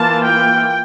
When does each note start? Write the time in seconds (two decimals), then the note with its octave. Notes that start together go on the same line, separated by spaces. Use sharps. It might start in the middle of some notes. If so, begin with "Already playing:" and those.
Already playing: E3 A#3 F4 A5
0.27 G5